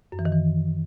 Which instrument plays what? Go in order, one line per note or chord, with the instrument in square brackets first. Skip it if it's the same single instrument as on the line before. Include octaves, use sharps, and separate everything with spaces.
[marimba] F#2
E3
D#3
E3